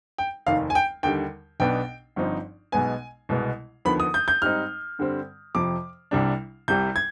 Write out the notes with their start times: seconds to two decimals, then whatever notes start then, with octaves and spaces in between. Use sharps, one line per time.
0.18 G5
0.47 F1 D#2 D#3 F5
0.70 G#5
0.75 G5
1.03 D#2 D3 G3 G5
1.60 B1 B2 B3 D4 G5
2.16 G1 G2 F3 C4 D#4
2.72 B1 B2 G#3 B3 G#5
3.29 C2 B2 G#3 B3
3.85 D#2 D3 F3 B3 B5
4.00 D#6
4.14 G6
4.28 G6
4.42 G#2 G3 C4 D#4 F6
4.99 G2 D3 G3 C4
5.55 F2 C3 F3 D6
6.11 C2 C3 G3 D4
6.68 C2 C3 G3 G6
6.96 G#6